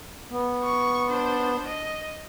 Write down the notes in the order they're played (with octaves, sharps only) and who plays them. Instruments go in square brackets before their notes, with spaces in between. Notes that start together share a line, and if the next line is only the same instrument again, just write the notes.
[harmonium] B3
[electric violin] C#6
D4 C5
D#5